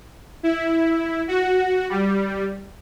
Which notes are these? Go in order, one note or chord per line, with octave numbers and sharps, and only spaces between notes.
E4
F#4
G3